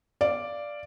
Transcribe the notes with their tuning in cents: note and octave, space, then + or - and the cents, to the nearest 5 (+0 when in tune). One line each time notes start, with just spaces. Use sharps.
D5 +0 F5 -15